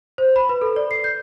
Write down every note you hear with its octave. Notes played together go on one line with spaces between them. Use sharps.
C5
B5
B4
A4
D5
C7
G6